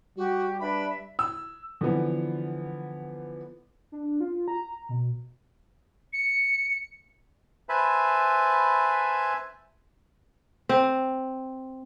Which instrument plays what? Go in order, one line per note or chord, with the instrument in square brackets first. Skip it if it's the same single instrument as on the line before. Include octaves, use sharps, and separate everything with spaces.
[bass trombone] G3 [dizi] F#4 [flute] G4
[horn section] D4 B4 [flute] E5 [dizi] B5
[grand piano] E6
[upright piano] D3 E3 F3 B3
[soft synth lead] D4
F4
A#5
B2
[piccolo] C#7
[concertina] B4 C5 E5 G#5 A5 B5
[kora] C4